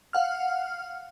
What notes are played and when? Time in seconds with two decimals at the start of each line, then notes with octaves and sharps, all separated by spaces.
0.13 F5 F#5 F6